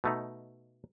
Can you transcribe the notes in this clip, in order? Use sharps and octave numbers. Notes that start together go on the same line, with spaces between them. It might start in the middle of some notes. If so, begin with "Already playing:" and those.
B2 A3 D#4